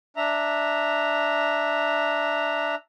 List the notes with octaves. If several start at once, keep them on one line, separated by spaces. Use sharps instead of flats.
D4 E5 A#5